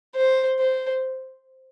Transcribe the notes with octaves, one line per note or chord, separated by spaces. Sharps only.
C5
C5